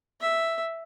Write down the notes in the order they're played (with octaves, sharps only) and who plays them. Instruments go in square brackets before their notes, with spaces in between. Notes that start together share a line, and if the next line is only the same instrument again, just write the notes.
[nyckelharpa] E5